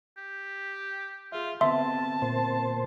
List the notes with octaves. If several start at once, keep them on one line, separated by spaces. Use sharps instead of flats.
G4
F4 G#4 E5
D3 B3 C4 E5 A5 C6
A#2 C5